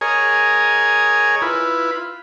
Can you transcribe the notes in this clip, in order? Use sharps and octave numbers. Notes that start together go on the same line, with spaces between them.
G#4 A#4 C#5 D#5 G#5
E4 F4 B4